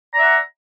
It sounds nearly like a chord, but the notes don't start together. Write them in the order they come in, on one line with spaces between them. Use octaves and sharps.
A#5 D5 E5 F#5